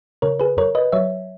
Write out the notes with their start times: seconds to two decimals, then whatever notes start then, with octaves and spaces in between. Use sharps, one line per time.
0.22 C#3 A#4 C#5
0.40 G#4 B4
0.57 F#2 A#4 C#5
0.75 B4 D#5
0.92 F#3 C#5 E5